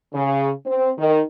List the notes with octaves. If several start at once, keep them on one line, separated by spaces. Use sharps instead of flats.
C#3
C4
D#3